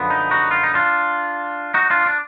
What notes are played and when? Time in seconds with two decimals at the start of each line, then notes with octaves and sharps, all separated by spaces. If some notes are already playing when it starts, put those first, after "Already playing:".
Already playing: F#2 D3 F3 B3
0.10 D#4
0.31 D#4 F#4
0.51 F4
0.63 D#4
0.74 D4 F4
1.74 D#4 F#4
1.90 D4 F4
2.06 D4